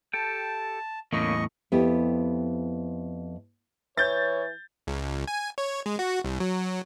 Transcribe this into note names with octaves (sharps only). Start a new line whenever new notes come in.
G4 A4 G5 A5
E2 A2 A#3 C#4 D#5 C#6
F2 B3 E4 G4
E3 C#5 G6 A6
C#2
G#5
C#5
G#3
F#4
C2
F#3